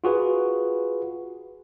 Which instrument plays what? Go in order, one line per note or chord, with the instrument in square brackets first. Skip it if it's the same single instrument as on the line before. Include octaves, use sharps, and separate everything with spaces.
[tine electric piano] F4 F#4 G#4 B4